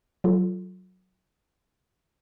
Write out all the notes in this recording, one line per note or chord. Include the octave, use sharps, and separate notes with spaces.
F#3 F4 A4